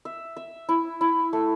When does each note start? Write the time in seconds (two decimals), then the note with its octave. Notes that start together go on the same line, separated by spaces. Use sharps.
0.05 E5
0.37 E5
0.69 E4
1.01 E4
1.33 A3